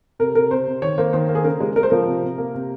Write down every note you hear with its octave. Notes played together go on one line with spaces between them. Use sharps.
C3 A#4
C3 A#4
C3 C5
C3
D#3 C#5
A#3 C5
D#3 C5
A#3
G#4
C#3 A#4
G#3
G#3 A#4
C5
F3 A#4
C3
C3
A#3
C3